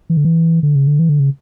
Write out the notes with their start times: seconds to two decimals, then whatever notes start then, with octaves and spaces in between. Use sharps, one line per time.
0.10 E3
0.17 D3
0.25 E3
0.63 D3
0.75 C#3
0.87 D3
0.99 E3
1.09 D3
1.20 C#3